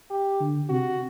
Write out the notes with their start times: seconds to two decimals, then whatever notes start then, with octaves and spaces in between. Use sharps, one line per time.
0.11 G4
0.40 D3
0.69 C3 F#4